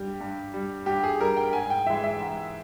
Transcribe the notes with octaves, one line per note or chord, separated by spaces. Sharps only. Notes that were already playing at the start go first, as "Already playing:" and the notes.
Already playing: G2 G3 G4
G2
G3
G2 G4
G#4
G3 A#4
G5
G#2 G#5
G5
E3 G#3 E5
E5
G#2